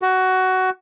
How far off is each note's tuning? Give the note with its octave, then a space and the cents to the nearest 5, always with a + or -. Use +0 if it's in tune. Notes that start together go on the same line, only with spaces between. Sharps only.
F#4 +15